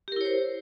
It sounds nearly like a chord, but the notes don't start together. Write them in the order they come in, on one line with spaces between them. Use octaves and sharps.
G4 A#4 E4 C#5 C5